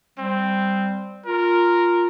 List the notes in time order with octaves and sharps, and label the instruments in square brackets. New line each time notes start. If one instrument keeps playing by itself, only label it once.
[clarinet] G3 [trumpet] C4
[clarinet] F4 [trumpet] A#4